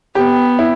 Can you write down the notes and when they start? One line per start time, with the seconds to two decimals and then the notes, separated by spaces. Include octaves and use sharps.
0.15 B3 G4
0.59 E4